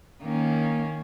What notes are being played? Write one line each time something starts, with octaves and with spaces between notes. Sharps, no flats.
D#3 A#3 C#4